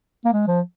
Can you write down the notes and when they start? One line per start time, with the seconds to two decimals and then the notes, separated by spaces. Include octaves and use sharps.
0.25 A#3
0.33 G#3
0.47 F3